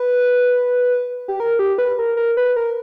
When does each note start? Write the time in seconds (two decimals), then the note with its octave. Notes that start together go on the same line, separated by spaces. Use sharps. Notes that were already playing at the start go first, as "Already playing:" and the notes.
Already playing: B4
1.28 G4
1.40 A#4
1.59 G4
1.78 B4
1.99 A#4
2.17 A#4
2.37 B4
2.56 A#4